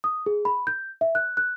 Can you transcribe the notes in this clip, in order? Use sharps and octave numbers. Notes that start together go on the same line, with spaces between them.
D#6
G#4
B5
G6
E5
F#6
F#6